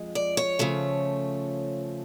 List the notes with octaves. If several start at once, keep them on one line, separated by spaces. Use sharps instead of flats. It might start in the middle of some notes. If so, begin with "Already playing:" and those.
Already playing: F2 F3 G#3
D5
C#5
C#3 F3 A3